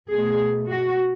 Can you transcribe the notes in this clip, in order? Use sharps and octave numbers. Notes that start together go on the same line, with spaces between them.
B2 A3 G#4
F#4